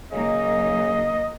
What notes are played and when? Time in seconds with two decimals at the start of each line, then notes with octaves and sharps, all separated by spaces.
0.12 C#3 F#3 A#3 D#4 D#5